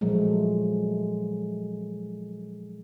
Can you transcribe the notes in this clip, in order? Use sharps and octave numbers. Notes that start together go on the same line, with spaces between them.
A#2 F3 F#3 G#3 A3